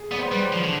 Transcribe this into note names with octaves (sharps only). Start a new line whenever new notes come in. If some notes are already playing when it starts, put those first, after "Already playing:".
Already playing: G#4
B3 D5
C5
B4
G3
C5
D5
F3
D3